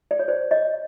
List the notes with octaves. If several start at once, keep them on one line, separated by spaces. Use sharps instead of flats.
D5
C#5
C5 D5
C#5 D#5